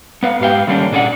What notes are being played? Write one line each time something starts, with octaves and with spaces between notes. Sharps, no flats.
B3 B4 F5
G#2 G4 F5 G5
D3 D#3 G3 A#3 C#4 D4
A#2 D4 G#4 B4 F#5